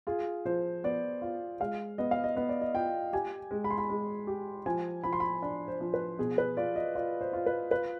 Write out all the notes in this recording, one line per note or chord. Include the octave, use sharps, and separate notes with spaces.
F4 G#4
F3 C5
B3 D5
F4
G#3 F5
B3 D#5
F5
D#5
B3 D#5
D5
D#5
F4 G5
G4 G#5
G#3
B5
C6
B5
G#3
G4
F3 G#5
F3 B5
C6
B5
D4 B5
C5
F3
B4
B2 G#4
B4
F4 D5
D#5
F4 D5
C5
F4
B4
F4 B4